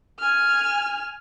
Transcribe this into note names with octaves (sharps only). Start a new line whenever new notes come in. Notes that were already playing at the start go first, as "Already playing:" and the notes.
G#5 F6